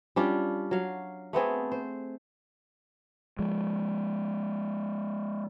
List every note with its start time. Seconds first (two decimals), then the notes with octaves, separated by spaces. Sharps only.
0.16 G3 C#4 D4 F4
0.71 F#3 F5
1.33 A3 B3 C4 G#4
1.72 C5
3.39 F3 G#3